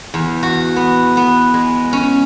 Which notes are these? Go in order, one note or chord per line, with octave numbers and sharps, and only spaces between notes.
E2
F#4
B3
B3
G#3
C#4